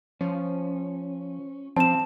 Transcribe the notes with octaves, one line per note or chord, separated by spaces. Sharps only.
F3 C#4
F3 C4 A5 E7